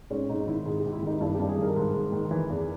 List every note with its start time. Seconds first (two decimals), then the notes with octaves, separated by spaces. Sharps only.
0.10 G#2 C#4
0.29 G#2 D#4
0.47 D#3 E4
0.65 G#2 G#4
0.79 G#2 G4
0.93 E4
1.02 D#3 D#4
1.21 G2 E4
1.34 G4
1.40 G2
1.49 G#4
1.57 D#3 A#4
1.76 G#2
1.94 G#2
2.12 D#3
2.31 E3
2.49 E2